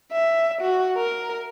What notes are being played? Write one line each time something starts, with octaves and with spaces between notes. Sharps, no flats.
E5
F#4
A#4